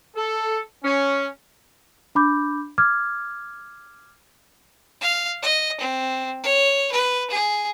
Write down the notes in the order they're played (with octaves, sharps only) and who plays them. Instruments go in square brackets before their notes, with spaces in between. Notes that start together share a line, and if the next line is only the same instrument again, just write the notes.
[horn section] A4
C#4
[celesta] D4 B5 D6 G6
D6 F6 G#6
[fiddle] F5
D#5
C4
C#5
B4
G#4